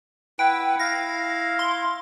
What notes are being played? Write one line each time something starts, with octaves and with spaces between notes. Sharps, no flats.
E4 B4 F#5 G5
E4 F5 A#6
C6